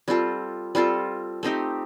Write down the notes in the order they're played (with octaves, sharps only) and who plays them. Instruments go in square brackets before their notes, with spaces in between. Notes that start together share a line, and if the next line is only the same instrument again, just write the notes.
[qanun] G3 C4 F4 A4
G3 C4 F4 A4
A3 C4 D#4 G4